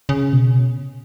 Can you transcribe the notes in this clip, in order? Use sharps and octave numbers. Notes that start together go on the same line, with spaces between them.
C#3
B2